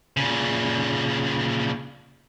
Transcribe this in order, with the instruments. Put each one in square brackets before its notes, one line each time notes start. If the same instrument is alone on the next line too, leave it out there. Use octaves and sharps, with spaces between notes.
[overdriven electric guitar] A#2 C#3